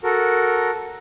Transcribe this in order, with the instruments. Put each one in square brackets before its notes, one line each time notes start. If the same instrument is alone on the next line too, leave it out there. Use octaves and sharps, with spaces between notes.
[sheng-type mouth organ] F#4 A4 A#4